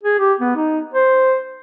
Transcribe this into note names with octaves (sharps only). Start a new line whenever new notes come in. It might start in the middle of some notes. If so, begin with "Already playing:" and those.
G#4
G4
B3
D#4
C5